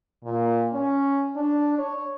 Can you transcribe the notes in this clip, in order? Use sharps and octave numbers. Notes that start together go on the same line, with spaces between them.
A#2
C#4
D4
C#5